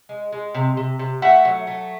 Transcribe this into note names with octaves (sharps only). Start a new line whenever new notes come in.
G#3
G#3
C3
C3
C3
A3 E5 F#5
F#3
A3